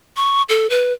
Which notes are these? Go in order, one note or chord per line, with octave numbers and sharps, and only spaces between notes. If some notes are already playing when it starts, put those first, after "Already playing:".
C#6
A4
B4